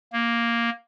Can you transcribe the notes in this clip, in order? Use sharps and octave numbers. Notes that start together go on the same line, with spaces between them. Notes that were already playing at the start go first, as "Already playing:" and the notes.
A#3